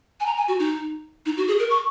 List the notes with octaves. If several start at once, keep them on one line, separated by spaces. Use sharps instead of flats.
G#5
A#5
G#5
F#4
D#4
D#4
F#4
G#4
A#4
C#6